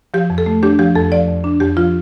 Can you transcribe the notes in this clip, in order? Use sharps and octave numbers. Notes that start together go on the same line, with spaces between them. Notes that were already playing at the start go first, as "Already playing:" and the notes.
F3 G4
F2
A4
A3
D4 G4
F3 G4
F2 A4
F3 D5
F2
D4
F2 G4
F3 F4